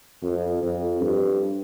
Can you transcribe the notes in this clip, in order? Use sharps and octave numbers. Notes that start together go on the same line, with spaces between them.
F2
F2
G2